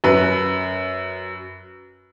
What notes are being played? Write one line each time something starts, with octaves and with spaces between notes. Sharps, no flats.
F#2 B4